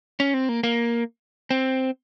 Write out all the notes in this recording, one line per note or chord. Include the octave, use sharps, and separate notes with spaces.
C#4
C4
A#3
A#3
C4